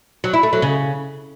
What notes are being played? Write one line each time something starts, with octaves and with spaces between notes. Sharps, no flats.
F#3
E4
A3
F#3
C#3